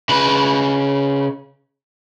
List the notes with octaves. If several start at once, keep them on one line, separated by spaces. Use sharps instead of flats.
C#3 B4